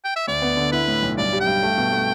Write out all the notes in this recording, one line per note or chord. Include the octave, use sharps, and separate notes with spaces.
G5
E5
D2 D5
B3
D3
E4 B4
A2
B1
G2 D5
G3
G5
G2
A3
B2
A3